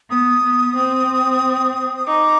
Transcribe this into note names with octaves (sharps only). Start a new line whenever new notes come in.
B3 D#6
B3
C4
D#6
D#4 D6